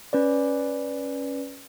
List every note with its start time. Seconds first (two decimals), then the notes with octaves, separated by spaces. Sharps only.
0.13 C#4 B4 D5